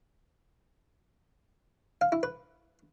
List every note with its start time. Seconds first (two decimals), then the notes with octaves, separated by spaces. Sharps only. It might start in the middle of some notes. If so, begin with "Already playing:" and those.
2.01 F5
2.12 E4
2.23 B4